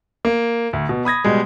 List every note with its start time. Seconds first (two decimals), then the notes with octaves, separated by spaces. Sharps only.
0.25 A#3
0.73 D2
0.89 B2
1.05 B5 D#6 G#6 A#6
1.24 B2 G3 G#3